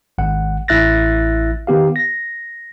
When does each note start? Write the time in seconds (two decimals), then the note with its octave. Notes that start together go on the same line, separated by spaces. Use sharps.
0.18 G#1 F#5
0.68 A1 E4 E5 F#6 A6 A#6
1.67 D#3 B3 G4 F5
1.96 A#6